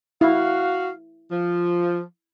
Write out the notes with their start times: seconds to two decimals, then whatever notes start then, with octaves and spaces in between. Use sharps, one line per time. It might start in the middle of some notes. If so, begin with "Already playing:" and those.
0.21 E4 F#4 F5
1.29 F3